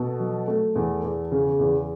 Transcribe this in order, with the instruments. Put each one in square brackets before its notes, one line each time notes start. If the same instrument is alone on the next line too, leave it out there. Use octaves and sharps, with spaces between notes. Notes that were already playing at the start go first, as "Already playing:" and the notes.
Already playing: [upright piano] B2 A4
F#3
A3
E2
E2
C#3
E2